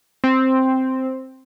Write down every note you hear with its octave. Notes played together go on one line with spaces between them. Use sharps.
C4